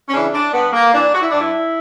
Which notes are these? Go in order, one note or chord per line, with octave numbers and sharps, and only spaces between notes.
C#4
C#3 E3 D4
D4
G2 B3
A#3
E3 D4
F#4
E4
G2 D4
E4